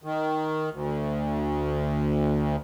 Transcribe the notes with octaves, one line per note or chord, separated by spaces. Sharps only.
D#3
D2